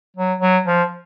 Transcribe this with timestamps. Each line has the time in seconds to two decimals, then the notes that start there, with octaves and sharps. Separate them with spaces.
0.17 F#3
0.41 F#3
0.66 F3